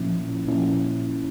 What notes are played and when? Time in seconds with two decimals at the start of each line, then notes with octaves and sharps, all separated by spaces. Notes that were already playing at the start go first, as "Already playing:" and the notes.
Already playing: A#2 F3 A#3 C#4 E4
0.47 A#2 F3 A#3 C#4 E4